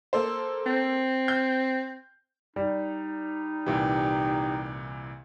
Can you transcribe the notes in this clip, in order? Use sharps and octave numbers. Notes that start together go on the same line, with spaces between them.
A#3 A4 C5
C4
G6
G3 D#4
C2 A#2 E3 G4